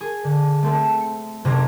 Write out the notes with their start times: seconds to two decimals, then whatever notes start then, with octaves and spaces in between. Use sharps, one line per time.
0.01 G#4
0.24 D3
0.63 A3 C4 A4
1.01 C#7
1.44 F#1 C3 A3 D#4 A#5 G#6